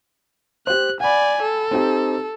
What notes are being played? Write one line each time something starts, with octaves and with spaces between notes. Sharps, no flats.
G4 C5 F#6
D5 F#5 G#5 B5
A4
C4 D#4 G4